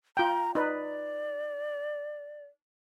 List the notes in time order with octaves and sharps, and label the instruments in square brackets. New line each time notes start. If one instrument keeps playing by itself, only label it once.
[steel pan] F4 G5 [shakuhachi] A#5
[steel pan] D#4 B4 [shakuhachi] D5